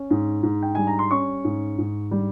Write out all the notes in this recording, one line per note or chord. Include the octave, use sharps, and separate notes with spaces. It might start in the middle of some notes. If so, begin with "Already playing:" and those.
Already playing: C#4
G#2
G#2
G5
G3 G#5
A#5
C6
C#4 C#6
G#2
G#2
G3